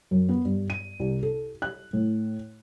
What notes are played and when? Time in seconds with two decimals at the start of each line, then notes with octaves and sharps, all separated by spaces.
0.11 F#2
0.29 B3
0.45 G2
0.70 D#7
1.00 C2
1.23 A4
1.62 F#6
1.93 A2